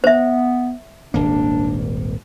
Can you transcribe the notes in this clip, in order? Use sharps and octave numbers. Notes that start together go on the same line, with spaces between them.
B3 C5 E5
D#1 G#1 A#3 D4